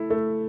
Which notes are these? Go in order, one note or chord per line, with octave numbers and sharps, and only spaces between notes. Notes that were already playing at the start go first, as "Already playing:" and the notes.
Already playing: A3 E4
A3